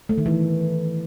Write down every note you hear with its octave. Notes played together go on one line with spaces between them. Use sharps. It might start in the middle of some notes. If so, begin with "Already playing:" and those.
A3
D#3
E3